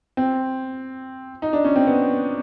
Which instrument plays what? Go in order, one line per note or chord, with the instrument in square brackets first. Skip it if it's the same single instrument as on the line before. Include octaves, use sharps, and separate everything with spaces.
[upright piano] C4
D#4
D4
C#4
C4
B3